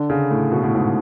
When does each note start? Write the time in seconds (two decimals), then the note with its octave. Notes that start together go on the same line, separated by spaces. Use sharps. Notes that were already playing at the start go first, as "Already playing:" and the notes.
Already playing: D3
0.10 C#3
0.31 A2
0.52 B2
0.63 A2
0.75 G#2